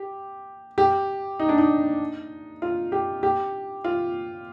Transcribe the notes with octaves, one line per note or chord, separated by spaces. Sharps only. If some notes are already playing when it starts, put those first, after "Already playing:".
Already playing: G4
G4
D#4
D4
D#4
F4
G4
G4
F4